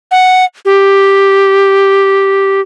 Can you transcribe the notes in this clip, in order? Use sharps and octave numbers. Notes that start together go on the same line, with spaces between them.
F#5
G4